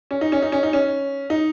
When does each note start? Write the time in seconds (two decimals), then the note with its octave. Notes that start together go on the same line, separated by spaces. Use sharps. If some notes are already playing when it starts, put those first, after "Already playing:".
0.11 C#4
0.21 D#4
0.32 C#4
0.42 D#4
0.52 C#4
0.63 D#4
0.73 C#4
1.30 D#4